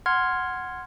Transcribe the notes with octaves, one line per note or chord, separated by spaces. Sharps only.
F#5 C6 F6 G#6